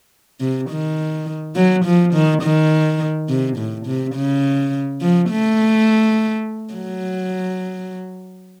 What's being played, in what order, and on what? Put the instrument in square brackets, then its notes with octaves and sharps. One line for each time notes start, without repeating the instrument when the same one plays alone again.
[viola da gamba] C3
D#3
F#3
F3
D#3
D#3
C3
A2
C3
C#3
F3
A3
F#3